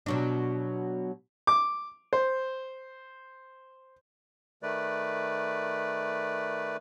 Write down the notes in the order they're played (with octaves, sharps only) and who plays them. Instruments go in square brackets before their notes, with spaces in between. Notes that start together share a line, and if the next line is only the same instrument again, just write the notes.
[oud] B2 F#3 D4
[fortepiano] D6
C5
[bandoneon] D#3 A3 B4 D5